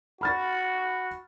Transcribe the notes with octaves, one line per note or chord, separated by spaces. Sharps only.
F#4 B5 F6 A6